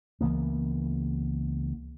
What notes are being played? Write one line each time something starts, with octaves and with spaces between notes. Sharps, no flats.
C#2 E3 A#3 B3